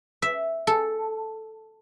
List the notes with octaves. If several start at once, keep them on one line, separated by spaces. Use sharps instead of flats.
E5
A4